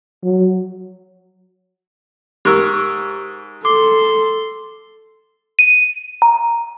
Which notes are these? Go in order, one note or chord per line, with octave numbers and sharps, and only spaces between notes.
F#3
G#2 G4 A#4 C#6 E6
A4 C6 D6
D#7
A#5